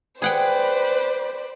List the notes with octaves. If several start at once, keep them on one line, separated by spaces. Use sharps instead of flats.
G#4 B4 C5 D5 F#5 G5